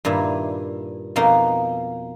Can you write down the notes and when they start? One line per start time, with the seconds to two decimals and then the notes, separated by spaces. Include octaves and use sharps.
0.05 G2 A#2 D#3 E4
1.16 F2 B2 A#3 D#4